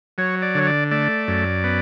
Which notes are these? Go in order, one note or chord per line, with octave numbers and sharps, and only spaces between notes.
F#3 C#5
D5
D3 C#5
D5
A3 D5
F#2
B3